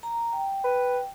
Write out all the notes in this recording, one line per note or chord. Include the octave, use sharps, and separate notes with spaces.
A#5
G5
B4